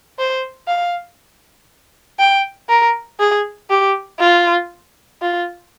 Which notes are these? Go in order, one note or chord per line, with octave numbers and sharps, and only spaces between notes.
C5
F5
G5
A#4
G#4
G4
F4
F4